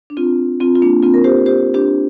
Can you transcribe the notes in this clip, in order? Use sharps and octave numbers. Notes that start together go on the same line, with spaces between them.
D4
C4 F4
C4 F4
F4
A#3 D4
C4 F4
A#4
G4 C5
G4 C5
D4 G4